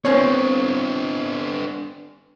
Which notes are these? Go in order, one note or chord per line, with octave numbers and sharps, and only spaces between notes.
B3 C4 D4 C#5